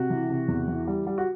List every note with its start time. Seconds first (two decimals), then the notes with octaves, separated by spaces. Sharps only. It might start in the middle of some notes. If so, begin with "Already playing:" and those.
Already playing: C3 F#4
0.10 E3
0.29 C3
0.48 E2
0.68 E3
0.87 G3
1.07 G3
1.18 F#4